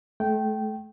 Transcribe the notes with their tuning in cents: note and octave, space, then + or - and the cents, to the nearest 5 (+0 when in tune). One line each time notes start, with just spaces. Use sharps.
A3 -30 G5 -15